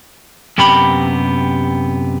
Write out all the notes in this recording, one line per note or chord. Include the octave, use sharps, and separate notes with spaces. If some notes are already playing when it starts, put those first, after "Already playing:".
F#2 C3 B3 G4 B5